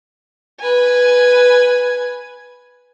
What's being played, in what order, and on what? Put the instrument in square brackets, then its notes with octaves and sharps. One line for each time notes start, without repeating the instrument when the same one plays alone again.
[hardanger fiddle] B4 G#5